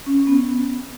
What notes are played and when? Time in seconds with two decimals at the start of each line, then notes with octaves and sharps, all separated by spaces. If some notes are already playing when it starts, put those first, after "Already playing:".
0.06 C#4
0.17 C#4
0.27 B3